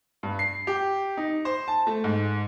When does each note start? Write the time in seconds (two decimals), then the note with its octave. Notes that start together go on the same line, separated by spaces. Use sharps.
0.23 G2
0.39 C7
0.67 G4
1.17 D#4
1.45 C5
1.68 A5
1.87 A3
2.04 G#2